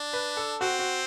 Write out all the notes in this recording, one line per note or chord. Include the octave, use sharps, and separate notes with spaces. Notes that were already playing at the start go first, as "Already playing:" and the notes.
Already playing: D4
B4
A4
C4 F#4
F#4